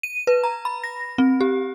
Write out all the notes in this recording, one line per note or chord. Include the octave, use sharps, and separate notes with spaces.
D#7
B4
A#5
B5
A#6
C4
G4